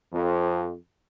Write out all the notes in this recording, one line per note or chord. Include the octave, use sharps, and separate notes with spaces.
F2